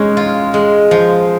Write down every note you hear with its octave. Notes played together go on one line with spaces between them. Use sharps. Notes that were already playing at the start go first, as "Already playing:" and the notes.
Already playing: G#3 C#4 D#4
F4
G#3
F3